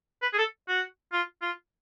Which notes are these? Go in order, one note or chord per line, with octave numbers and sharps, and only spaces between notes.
B4
G#4
A4
F#4
F4
F4